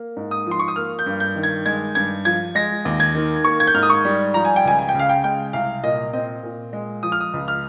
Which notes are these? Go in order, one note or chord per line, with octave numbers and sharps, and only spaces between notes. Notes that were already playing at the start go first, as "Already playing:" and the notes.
Already playing: A#3
G#2
D#6
F3 C6
C#6
D#6
A#3 F6
G6
G2
G6
D#3
G#6
G#3 G#6
G2 G#6
F3 G#6
G#3 A#6
D#2
G#6
D#3
A#3 C#6
G#6
G6
G#2 F6
D#6
C#6
G3
F3 A#5
G#5
G5
C#2 G#5
G#5
G5
C#3
F5
G5
G#3 G5
C2 F5
A#2 D#5
C4 D#5
A#2
G#3
F3 D#6
F6
D#6
C#2
F6